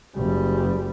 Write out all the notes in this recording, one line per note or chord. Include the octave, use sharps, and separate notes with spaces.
F#1 G3